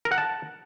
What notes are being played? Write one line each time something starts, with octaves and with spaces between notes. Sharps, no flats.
A#4
F#5
A5